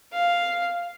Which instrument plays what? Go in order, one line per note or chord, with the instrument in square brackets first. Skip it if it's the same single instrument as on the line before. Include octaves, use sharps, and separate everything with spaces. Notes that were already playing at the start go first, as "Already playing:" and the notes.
[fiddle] F5